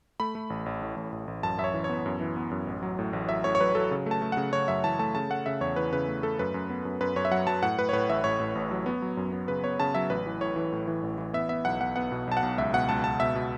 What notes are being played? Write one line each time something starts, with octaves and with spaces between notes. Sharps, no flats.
A3 B5
A3
A1
A1
A2
A1
A1
A1
F#2 A5
F#2 E5
C#5
E3
B3 C#5
F#2
E3
B3
F#2
A1
F#3
A2
A1
F#3 E5
A2 C#5
C#5
F#3 B4
F#3 A4
C#3
A3 A5
A3
C#3 F#5
C#3 C#5
F#2 E5
E3 A5
A3 A5
C#3 A5
A3 F#5
C#3 E5
E2 C#5
E3 B4
C#3 B4
A3
A3 A4
F#2 B4
F#2
B3
F#2
F#2 B4
F#2 C#5
E5
F#3 F#5
F#3 A5
A2 F#5
A2 B4
C#5
A2 B4
A1 E5
A2 C#5
A2
A1
F#3
B3
F#3
F#2
B3
C#3 B4
B3 C#5
C#3 A5
F#3 E5
A1 B4
E3
A2 C#5
E3
A2
E3
A1
E3
B3 E5
B3 E5
B1 F#5
B1 F#5
B3 F#5
B2
B1 A5
F#5
B1
C#2 E5
B2 F#5
C#2 A5
C#2 A5
B2 E5
B2